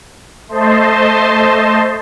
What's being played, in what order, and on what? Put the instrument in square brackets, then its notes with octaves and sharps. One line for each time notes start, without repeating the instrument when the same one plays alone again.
[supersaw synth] A3 C5 D#5 A5 C6